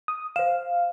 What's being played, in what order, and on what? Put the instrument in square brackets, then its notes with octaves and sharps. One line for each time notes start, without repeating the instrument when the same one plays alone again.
[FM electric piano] D#6
[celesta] C5 E7 [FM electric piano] F5